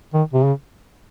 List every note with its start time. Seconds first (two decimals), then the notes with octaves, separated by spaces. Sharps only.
0.13 D#3
0.33 C3
0.44 C#3